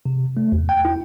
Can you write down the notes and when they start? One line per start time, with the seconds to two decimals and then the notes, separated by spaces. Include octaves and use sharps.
0.06 C3
0.37 A3
0.52 E2
0.69 G5
0.85 E4